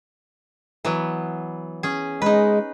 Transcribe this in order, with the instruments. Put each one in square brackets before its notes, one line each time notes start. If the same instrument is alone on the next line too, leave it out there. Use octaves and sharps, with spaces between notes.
[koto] E3 F#3 B3
C#4 G#4
[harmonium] G#3 [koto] D#4 B4